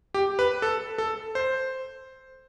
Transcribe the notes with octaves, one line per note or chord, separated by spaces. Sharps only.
G4
B4
A4
A4
C5